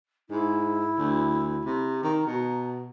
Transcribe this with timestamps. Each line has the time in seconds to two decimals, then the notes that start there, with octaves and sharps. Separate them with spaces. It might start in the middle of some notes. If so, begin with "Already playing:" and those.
0.30 G#2 E4
0.98 D2
1.65 C3
2.03 D#3 A#5
2.27 B2